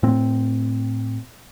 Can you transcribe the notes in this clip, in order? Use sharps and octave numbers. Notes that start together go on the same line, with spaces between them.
A2 C4